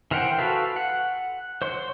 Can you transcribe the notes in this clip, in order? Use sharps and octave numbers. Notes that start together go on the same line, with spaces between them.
E3 A#4 C5 F#5 G5
F#4 A4 B4 F5
F#5
C5 C#5 C6